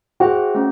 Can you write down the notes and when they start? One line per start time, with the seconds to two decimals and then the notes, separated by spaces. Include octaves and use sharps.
0.20 F#4 G#4 C5 E5 G5
0.55 A3 C#4